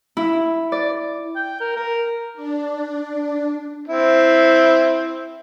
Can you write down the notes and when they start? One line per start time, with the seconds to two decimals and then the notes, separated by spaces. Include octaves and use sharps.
0.17 E4
0.72 D5
1.36 G5
1.60 A#4
1.76 A#4
2.34 D4
3.88 C4 E4